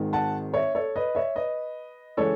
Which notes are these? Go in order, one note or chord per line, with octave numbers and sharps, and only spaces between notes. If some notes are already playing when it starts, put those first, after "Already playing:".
Already playing: G#1 G#2 D#3 G#3
F#5 A5
C#5 E5
A4 C#5
B4 D#5
C#5 E5
B4 D#5
C#3 E3 G#3 A4 C#5